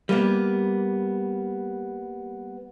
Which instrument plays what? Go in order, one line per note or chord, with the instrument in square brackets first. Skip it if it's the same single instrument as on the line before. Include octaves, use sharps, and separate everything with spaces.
[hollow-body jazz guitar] G3 A#3 B3